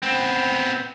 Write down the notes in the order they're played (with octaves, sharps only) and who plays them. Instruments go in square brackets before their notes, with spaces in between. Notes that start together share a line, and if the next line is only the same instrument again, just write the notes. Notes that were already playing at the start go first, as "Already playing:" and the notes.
[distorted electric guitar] B3 C4